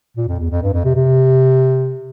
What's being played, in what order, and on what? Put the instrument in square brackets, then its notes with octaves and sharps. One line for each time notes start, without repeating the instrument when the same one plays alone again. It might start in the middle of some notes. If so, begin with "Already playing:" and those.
[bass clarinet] A#2
F2
E2
F2
G2
F2
C3
C3